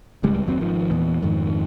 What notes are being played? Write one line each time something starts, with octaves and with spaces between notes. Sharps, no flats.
D1 C#2 G3 G#3
F#1 D#2 F#3 C4
G#1 D#3 F3
E2 A#2 E3 B3
F2 G#2 D#3